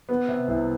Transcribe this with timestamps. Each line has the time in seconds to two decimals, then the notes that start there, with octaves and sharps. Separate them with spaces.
0.09 B3
0.28 C3
0.48 C2